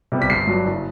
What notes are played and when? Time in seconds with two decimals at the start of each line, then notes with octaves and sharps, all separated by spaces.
0.12 C3 G3 B3
0.22 B6
0.30 G1 C7
0.47 G2 F#3
0.65 F#1